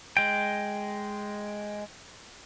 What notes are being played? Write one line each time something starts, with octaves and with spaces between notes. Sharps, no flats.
G#3 G5